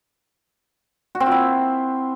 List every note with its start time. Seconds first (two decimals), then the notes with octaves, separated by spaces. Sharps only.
1.15 F#4
1.20 C4
1.26 F4
1.32 E4